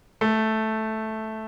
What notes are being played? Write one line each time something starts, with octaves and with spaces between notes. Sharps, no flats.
A3